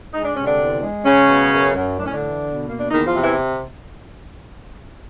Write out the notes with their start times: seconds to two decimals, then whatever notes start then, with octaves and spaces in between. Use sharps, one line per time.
0.13 G#3 D#4
0.24 D4
0.35 C3 C#4
0.45 D3 D4
0.59 E2
0.82 G#3
1.05 C#3 G#3 C#4
1.28 B2
1.52 F#2
1.76 F#2
1.99 A2 D4
2.06 C#4
2.14 D3 D4
2.22 E3
2.45 B2
2.68 A#3
2.79 D4
2.91 E2 D#3 D#4
3.07 F3 F4
3.14 C3
3.22 E3 E4